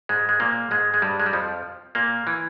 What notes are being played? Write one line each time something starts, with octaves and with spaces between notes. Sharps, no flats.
G#2 G#3
G#3
A#2 A#3
G#2 G#3
G#3
G2 G3
G#3
G3
F2 F3
A#2 A#3
E3